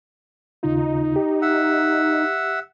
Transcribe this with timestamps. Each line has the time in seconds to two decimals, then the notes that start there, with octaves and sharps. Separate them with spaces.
0.63 D#2 C#3 D#4 F4
1.16 G4
1.42 E5 F#5